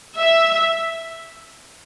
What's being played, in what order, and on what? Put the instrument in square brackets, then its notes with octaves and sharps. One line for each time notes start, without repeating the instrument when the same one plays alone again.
[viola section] E5